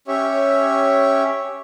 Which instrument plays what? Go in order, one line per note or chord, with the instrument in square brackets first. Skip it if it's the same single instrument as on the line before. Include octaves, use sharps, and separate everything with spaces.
[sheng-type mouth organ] C#4 G4 C#5 E5